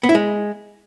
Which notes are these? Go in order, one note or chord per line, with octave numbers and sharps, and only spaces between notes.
B3
E4
G#3